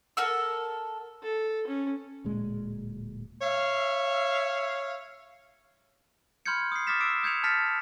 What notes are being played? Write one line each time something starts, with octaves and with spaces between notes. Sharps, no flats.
A4 A#4 F#5 E6
A4
C#4
D1 A#2 G#3
C#5 E5 F5
B5 C6 F6 G6 G#6 C#7
D#6 C7
D6 D#6 F6 A6 B6 E7
D6 E6 B6 C7 D7 E7
D#6 G6 G#6 C#7 F7
A5 F6 A6 B6 C#7